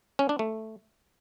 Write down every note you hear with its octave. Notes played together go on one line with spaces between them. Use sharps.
C#4
D4
A3